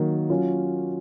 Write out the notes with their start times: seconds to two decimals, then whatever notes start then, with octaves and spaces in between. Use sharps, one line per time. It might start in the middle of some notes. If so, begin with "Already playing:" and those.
Already playing: D#3 F#3 A#3
0.30 F#3 C#4 F4